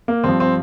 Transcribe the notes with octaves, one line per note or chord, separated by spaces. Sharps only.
A#3
G2 F3 C4
C4